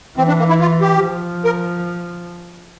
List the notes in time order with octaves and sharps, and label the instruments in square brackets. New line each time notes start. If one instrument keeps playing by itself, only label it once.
[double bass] E3 [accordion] C4
[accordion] D4
A#3
E4
F4
G4
[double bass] F3
[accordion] A#4